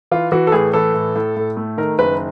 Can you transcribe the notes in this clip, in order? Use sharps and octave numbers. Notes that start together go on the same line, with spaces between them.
E3 F4
E3 F#4
A4
A2 G#4
E3 A4
A2
A2
A2
A3
D#3 A#4
F#1 B4